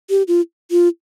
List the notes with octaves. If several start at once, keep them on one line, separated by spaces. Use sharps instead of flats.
G4
F4
F4